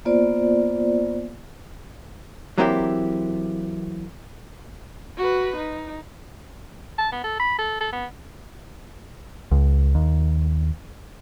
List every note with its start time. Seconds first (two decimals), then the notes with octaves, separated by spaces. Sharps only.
0.05 A#3 B3 F4 C5 D5
2.58 E3 F#3 A#3 C4 E4 G4
5.17 F#4 B4
5.56 D#4
6.98 A5
7.12 B3
7.24 A4
7.40 B5
7.59 A4
7.81 A4
7.93 B3
9.51 C#2
9.95 D#2